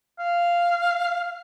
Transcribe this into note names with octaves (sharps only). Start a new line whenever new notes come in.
F5